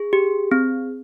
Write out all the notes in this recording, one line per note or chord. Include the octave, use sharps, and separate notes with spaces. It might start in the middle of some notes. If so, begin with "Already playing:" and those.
Already playing: G#4
G4
C4